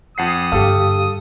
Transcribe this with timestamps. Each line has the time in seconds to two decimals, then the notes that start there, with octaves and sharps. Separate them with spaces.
0.18 F2 F#5 D#6 C7
0.52 G2 D3 G4 A4 F5